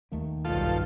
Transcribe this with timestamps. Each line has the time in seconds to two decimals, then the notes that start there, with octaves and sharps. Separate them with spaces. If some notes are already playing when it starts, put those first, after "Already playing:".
0.12 D#2 D#3 A3 A#3
0.45 B1 G2 F4 A4